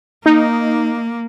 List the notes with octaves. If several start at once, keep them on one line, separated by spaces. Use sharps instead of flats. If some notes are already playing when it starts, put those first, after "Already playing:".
A#3 D#4